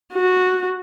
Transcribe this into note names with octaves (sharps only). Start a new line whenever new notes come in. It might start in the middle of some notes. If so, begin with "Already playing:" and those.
F#4